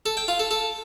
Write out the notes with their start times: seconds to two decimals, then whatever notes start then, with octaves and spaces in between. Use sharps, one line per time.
0.06 A4
0.17 G5
0.28 F4
0.39 A4
0.51 A4